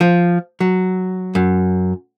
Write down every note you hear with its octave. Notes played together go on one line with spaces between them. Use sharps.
F3
F#3
F#2